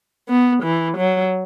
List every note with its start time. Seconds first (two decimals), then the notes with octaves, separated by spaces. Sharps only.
0.29 B3
0.64 E3
0.98 F#3